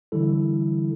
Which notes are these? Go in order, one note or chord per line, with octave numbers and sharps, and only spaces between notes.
D3 E3 G3 E4 A4